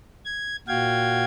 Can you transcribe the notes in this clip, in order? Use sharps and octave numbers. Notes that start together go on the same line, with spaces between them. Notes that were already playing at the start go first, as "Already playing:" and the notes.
G#6
A#2 F#4 F5 G5 G#6